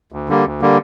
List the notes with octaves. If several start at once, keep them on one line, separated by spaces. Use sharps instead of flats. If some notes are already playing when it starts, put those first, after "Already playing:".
D2
D3 G3 A#3
D2
D3 G3 A#3